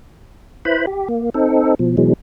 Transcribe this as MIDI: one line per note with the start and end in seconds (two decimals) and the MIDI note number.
0.65 0.86 64
0.65 0.86 71
0.65 0.86 72
0.65 0.86 83
0.87 1.08 67
1.08 1.30 58
1.34 1.75 60
1.34 1.75 63
1.34 1.75 69
1.79 1.96 47
1.79 1.96 53
1.97 2.13 47
1.97 2.13 52
1.97 2.13 54
1.97 2.13 56